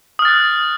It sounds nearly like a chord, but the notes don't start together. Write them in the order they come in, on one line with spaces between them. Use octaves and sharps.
D#6 F6 A6 F#6